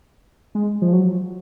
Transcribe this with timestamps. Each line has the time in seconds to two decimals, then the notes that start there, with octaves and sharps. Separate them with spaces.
0.55 G#3
0.82 F3
0.93 F#3